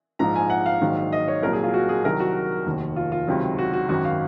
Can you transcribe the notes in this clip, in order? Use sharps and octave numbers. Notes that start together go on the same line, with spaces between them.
A#1 G#2 F3 A#5
G#5
F#5
F5
A#1 G#2 D#3 F#3
D#5
C#5
C2 A#2 F#3 A#4
G#4
F4
F#4
G#4
C2 C3 D#3 F#3 A#4
F#4
F1 D#2 D#3
F4
F4
C#2 C3 D#3 F#3
F#4
F#4
G#1 F#2 D#3 F#4
F5